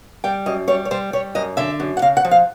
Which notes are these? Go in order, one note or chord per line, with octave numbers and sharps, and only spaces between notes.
G3 G5
F#2 D#5
G3 C#5
C#5
G3 C5
G3 C#5
F#2 D#5
D3 E5
F#2
F#5
C#3 F5
F#5
F3
F5